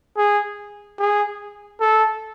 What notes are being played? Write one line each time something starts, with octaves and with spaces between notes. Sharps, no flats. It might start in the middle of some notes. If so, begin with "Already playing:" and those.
G#4
G#4
A4